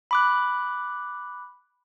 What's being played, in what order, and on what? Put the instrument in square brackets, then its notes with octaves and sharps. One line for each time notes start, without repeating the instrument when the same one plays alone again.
[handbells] B5 D6 F#6